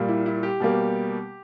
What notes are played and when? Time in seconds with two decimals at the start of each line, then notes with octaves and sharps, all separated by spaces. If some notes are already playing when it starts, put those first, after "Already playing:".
Already playing: A#2 G3 A#3
0.08 E4
0.26 E4
0.43 G4
0.60 B2 G3 A#3